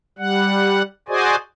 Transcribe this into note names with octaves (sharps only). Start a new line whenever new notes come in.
G3 F#5
F#4 G#4 C5 D5 D#5 G#5